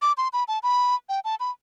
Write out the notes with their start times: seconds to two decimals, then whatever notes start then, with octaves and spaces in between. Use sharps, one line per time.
0.02 D6
0.17 C6
0.33 B5
0.48 A5
0.63 B5
1.09 G5
1.25 A5
1.40 B5